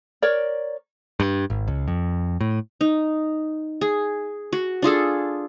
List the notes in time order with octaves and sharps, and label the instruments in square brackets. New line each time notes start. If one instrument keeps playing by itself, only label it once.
[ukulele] A#4 C#5 D5
[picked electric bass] G2
G#1
C#2
F2
A2
[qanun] D#4
G#4
F#4
D4 F4 G#4 A4